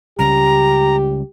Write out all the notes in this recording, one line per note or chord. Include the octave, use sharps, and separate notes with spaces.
C#2 C#3 G3 G4 A#5